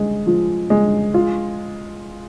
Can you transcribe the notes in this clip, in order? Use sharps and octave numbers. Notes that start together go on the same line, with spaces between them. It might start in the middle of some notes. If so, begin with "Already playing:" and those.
Already playing: G#3
F3
G#3
F4